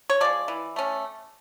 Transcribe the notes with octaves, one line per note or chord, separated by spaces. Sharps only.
C#5
F3 G#3 D5
E3
A3 C#4